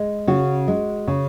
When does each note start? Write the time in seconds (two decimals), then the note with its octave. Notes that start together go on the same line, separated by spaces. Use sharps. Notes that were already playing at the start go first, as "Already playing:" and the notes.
Already playing: G#3
0.27 C#3 F#4
0.68 G#3
1.08 C#3